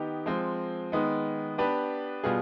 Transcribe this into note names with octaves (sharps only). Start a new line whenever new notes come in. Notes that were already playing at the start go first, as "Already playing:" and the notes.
Already playing: D#3 B3 D#4 G4
F3 G#3 C4
D#3 G#3 B3 D#4
B3 D4 G4 B4
B2 G3 B3 F4 G#4